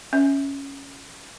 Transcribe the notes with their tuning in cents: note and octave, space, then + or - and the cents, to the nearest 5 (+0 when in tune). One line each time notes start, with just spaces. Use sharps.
C#4 +0 E5 -20